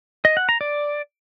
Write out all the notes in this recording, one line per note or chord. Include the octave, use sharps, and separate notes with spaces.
D#5
F#5
A#5
D5